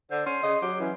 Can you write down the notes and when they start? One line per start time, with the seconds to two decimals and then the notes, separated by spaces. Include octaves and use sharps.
0.11 D3 C5
0.26 C#4 C6
0.43 C#3 D#5
0.62 F#3 G4
0.80 E3 C#4